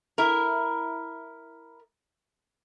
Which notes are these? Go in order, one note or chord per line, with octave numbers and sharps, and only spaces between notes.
E4 A#4